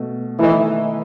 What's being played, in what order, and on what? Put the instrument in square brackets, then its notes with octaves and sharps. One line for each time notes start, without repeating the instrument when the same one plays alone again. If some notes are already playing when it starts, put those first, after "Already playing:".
Already playing: [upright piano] B2 A3
[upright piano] D#3 A3 E4 A4 D#5 [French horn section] E3